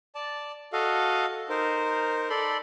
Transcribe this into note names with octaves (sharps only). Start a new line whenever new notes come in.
D5 A5
F#4 A4 D#5 F5
D#4 A#4 C5
A4 D5 B5 C6